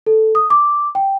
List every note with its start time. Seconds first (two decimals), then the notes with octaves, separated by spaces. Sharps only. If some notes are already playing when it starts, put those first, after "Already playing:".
0.06 A4
0.35 D#6
0.50 D6
0.95 G5